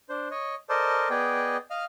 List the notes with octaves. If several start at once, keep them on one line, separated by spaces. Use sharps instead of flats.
D4 C5
C#5 D#5
A4 A#4 C5 D5 D#5 A5
B3 G#4 D5 D#5 G5
D#5 F5 F6